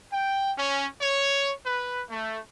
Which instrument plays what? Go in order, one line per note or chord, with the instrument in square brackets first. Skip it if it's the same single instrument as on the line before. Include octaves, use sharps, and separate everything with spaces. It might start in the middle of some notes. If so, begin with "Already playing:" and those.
[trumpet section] G5
C#4
C#5
B4
A3